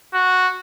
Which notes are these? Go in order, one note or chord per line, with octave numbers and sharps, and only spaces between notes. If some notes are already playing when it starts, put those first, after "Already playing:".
F#4